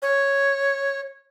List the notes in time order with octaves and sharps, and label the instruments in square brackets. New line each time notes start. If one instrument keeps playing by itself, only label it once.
[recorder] C#5